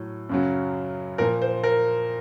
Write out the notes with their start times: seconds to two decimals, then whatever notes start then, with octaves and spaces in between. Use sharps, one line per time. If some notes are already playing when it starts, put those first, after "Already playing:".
Already playing: A2 F#3
0.29 F#2 C#3 F#3
1.18 A#2 F3 A#4
1.42 C5
1.63 A#4